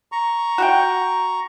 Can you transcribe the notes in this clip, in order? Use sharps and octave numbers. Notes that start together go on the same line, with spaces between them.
A#5 C#6
F#4 F#5 G5